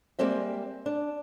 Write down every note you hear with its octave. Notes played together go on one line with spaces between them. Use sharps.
G3 G#3 A#3 C4 E5
D4